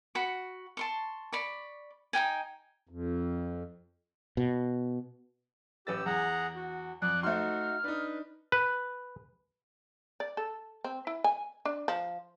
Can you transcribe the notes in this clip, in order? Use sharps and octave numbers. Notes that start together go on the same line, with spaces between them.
F#4 B5 C#6
A5 C6 C#6
D5 B5 C#6
D#4 A#4 G5 G#5
F2
B2
A1 G4 B4 E6 A6
E2 G#4 F#5 A#5
F#4
F2 D5 F#6
A3 D#4 F#4 C5 C6 F6
D4 D#4 B4
B4
D5
A4
C4
E4
G#5
D4
F3